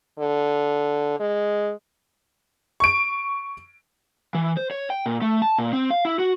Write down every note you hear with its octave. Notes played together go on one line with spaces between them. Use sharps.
D3
G#3
C#6 D7
E3
C5
C#5
G5
A#2
A3
A5
A#2
C4
F5
E4
F#4